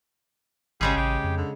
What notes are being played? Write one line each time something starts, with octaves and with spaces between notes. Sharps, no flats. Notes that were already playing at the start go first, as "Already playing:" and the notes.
G#1 C#3 G3 G#3 G#4
A1 G4
F2
D3